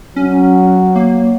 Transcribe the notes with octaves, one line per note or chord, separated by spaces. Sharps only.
F#3 C#4
A#3